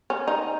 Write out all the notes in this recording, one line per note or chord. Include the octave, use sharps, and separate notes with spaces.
C#4
D#4